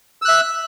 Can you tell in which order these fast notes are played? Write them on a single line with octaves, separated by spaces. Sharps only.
E6 F#6 E5